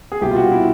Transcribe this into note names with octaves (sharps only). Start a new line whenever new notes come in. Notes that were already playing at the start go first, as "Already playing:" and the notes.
G#4
C2 B2 G3 G4
F4
F#4
E4